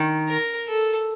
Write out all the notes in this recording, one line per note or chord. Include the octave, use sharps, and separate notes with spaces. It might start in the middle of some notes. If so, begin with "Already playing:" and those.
Already playing: D#3
A#4
A4